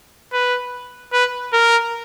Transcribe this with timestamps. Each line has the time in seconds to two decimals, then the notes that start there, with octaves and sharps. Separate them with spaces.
0.33 B4
1.13 B4
1.53 A#4